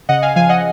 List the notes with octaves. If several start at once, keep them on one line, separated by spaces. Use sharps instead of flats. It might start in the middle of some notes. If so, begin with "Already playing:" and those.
C#3 D#5 F#5
F5 G#5
F3 F5 G#5
D#5 F#5